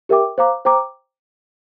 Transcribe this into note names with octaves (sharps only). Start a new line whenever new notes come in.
G4 A#4 E5 G5 D6
C5 F5 A#5 D6
C5 G5 A#5 D6